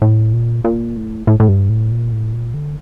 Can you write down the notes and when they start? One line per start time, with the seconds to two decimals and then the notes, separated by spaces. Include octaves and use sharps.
0.02 A2
0.33 A#2
0.64 A#2
0.97 A2
1.27 A2
1.40 A2
1.48 G2
1.69 A2
1.91 A#2
2.12 A2
2.33 A#2
2.54 D3